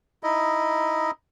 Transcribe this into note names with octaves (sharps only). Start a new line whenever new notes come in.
D#4 E4 D#5